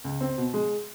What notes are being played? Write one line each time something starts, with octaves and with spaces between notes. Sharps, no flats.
C#2
C4
B2
G#3